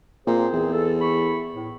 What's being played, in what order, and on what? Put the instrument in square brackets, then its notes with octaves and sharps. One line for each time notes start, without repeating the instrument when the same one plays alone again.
[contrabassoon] A#2 [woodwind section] C4 G#4 C5
[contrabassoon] E2
[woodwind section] A4
E4 B5 C#6
A2